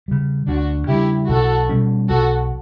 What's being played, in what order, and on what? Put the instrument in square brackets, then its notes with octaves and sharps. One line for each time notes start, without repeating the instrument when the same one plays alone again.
[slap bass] C#3 G3
[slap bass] D2 [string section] D4 F#4
[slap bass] C#3 G3 [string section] E4 G4
[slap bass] B1 [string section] F#4 A4
[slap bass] B2 G3 C#4
[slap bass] B1 [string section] F#4 A4